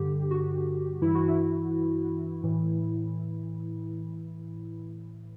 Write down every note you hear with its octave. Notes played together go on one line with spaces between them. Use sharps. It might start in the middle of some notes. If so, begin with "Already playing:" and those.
Already playing: G2 D3 G4
F#4
G2 E3 E4
F#4
E4
A2 E3